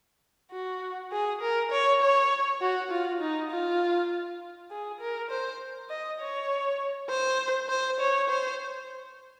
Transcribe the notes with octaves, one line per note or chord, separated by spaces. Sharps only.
F#4
G#4
A#4
C#5
C#5
F#4
F4
D#4
F4
G#4
A#4
C5
D#5
C#5
C5
C5
C#5
C5